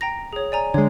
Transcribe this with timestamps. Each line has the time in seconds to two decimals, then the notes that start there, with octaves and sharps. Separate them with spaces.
0.01 G5 A#5 A#6
0.33 G#4 C#5
0.52 D5 G#5 A#5
0.74 D3 G#3 C#5